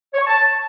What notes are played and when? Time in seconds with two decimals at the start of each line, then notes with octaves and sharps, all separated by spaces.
0.13 C#5
0.20 C#6
0.27 A5